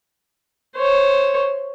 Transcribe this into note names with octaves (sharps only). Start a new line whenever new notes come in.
C5 C#5